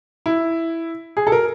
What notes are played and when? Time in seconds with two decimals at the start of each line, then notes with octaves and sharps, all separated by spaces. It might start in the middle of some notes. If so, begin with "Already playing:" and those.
0.26 E4
1.17 G#4
1.27 A4
1.32 A#4